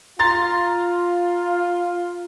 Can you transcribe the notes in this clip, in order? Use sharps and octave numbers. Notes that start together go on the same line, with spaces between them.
F4 A#5 C6 A6